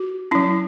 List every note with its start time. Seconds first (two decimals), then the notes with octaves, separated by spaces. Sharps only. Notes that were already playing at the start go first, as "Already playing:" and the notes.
Already playing: F#4
0.31 F#3 C#4 E4